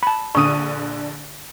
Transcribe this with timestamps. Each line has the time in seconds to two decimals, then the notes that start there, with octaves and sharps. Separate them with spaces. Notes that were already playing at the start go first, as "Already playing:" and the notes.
0.03 A5 B5
0.35 A#1 D3 C#6 D#6 D#7